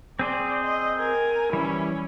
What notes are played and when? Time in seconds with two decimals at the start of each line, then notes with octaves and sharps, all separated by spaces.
0.19 C4 G#4 C5 D5
0.64 D#5 C6
0.98 A#4 G#5
1.53 E3 G3 C#4 E4